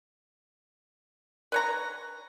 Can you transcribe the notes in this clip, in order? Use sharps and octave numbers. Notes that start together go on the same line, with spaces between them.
B4 C#5 A#5